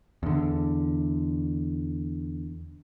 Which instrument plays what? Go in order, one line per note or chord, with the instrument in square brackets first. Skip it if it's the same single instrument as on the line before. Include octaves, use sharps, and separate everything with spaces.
[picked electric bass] E2 D3